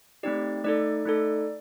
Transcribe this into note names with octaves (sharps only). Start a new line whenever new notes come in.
A3 C4 D#4 G4 D5
A3 D#4 A4 D5
A3 D#4 A4